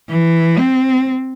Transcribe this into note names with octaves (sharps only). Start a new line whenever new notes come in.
E3
C4